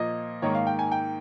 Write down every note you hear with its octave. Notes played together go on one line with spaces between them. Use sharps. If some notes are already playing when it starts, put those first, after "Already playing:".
Already playing: A#2 F3 A#3 D#5
G#2 D#3 A#3 C#5
F5
G5
G#5
G5